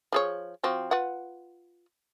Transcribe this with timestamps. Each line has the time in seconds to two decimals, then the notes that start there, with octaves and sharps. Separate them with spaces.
0.12 F3 G#4 C#5
0.63 F3 C4 F#4
0.91 F4 B4 F#5